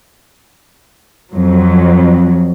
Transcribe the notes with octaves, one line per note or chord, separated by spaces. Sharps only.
F2 F#3